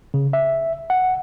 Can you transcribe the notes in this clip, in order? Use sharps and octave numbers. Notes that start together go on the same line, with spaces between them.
C#3
E5
F#5